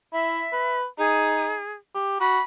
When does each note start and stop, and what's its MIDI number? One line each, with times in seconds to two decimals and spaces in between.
0.13 0.44 64
0.13 0.76 76
0.52 0.85 71
0.98 1.57 63
0.98 1.73 68
1.94 2.18 67
2.20 2.39 66
2.20 2.42 83